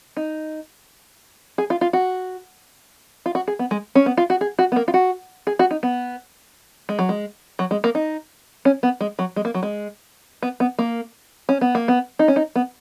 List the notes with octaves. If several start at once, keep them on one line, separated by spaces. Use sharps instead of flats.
D#4
G#4
F4
F4
F#4
F4
F#4
G#4
B3
G#3
C#4
B3
F4
F#4
G#4
F#4
B3
A#3
F4
F#4
G#4
F#4
D#4
B3
G#3
F#3
G#3
F#3
G#3
A#3
D#4
C#4
B3
G#3
F#3
G#3
A#3
F#3
G#3
B3
B3
A#3
C#4
B3
A#3
B3
D#4
C#4
D#4
B3